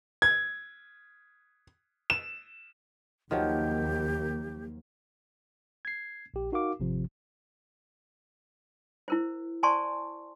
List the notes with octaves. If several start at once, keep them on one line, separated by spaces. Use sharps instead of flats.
G#6
E7
D#2 D#3 F3 F#3 A#3 G4
G#6 C7
A#1 G4
D#4 F#4 A#4 F5 D6
G#1 C3 F3
E4 A#4 C5
C5 D5 G#5 A5 C6 C#6